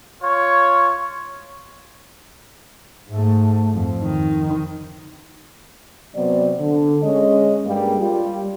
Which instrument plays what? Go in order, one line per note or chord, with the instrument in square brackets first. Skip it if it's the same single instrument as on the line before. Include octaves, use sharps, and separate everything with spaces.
[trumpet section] F4 C#5
[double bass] G#2 A3
F2
D#3
[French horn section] C3 F#3 B3 C4 D5
D3
G#3 C#4 D#5
G2 G3 G#3 A#3
G3 F4 G4